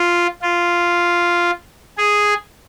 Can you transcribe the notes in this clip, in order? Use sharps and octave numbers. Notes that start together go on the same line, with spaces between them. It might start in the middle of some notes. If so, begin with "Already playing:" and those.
Already playing: F4
F4
G#4